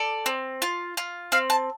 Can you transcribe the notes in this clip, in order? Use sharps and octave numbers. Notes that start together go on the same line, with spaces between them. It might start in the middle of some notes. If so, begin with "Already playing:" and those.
Already playing: A4 D5
C4
F4
F4
C4 F5
A5